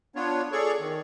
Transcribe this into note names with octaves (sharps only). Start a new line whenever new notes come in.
B3 D4 F4 C#5
G#4 A4 C#5 D5 C#6
D#3